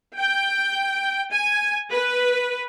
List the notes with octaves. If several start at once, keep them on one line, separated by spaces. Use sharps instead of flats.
G5
G#5
B4